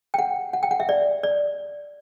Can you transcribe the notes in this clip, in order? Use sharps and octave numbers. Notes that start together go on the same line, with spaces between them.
G5
F#5
F#5
G5
F#5
E5
D5
D5